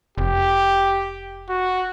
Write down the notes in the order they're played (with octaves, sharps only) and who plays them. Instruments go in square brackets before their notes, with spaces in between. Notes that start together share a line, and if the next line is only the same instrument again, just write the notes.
[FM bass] F1 [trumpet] G4
[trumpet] F#4